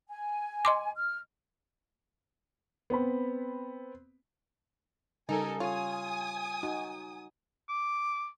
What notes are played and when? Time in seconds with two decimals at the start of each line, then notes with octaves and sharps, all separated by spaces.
0.09 G#5
0.65 D#5 C6 D6
0.96 F6
2.90 B3 C4 B5
5.29 C#3 G3 D#4 A4 A#4 G#5
5.60 F4 C#5 G#5 D#6
6.63 D#4 F#4
7.69 D6